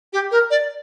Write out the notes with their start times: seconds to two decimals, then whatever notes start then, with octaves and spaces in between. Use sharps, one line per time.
0.13 G4
0.31 A#4
0.50 D5